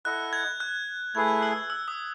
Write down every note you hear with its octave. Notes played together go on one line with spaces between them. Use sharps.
E4 A4 D#5 F#5 F#6
G#6
F#6
A3 E4 G#4 B4 G#6
F#6
E6
E6
D#6